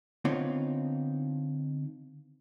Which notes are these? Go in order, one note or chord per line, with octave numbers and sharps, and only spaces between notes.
D3 B3 C4 D#4 F4 C#5